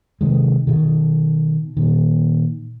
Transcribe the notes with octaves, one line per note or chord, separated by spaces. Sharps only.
C3 D#3 G#3
B2 D#3
A#2 D#3